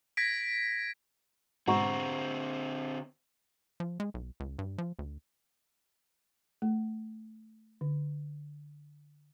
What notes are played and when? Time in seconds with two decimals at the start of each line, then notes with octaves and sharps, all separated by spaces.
0.17 G#6 A#6 B6 D7
1.68 G#2 B2 D3 G#3 C4 F#5 A#5 C#6
3.80 F3
4.00 G#3
4.14 B1
4.40 C#2
4.59 G2
4.78 F3
4.99 D2
6.62 A3
7.81 D3